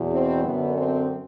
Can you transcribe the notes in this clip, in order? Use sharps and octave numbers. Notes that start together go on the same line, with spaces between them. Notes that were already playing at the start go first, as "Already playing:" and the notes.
Already playing: E2 B2
C4
F#2 D3 B3
C4